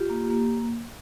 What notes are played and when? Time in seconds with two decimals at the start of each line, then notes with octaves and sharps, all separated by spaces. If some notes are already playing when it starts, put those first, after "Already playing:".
Already playing: F4 G4
0.10 A#3
0.30 A#3